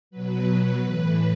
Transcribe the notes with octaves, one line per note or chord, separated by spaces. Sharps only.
B2 F#3 B4
A2 E3